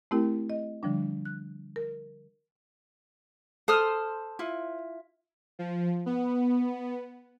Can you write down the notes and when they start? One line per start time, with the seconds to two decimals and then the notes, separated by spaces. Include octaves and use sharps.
0.11 A3 C4 E4 G4 A#4 G5
0.50 D#5
0.83 D3 F3 G3 D4
1.25 F#6
1.76 A#4
3.68 A4 C5 D#6 F6
4.39 E4 F4
5.59 F3
6.06 B3